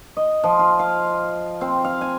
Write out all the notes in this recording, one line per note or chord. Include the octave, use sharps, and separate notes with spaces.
D#5
F3
F4
F5
C4
F5
G#5